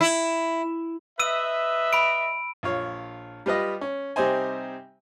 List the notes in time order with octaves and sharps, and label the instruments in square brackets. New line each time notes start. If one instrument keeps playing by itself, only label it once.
[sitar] E4
[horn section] B4 D#5 E5 [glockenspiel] E6 D#7
[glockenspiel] B5 D7
[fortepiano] A#1 F4 C#5
G3 F4 B4 D#5
C#4
C3 G3 C4 D#4 C5 G#5